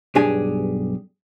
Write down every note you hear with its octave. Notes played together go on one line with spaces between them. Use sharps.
B1 G2 D4 G4 G#4 G#5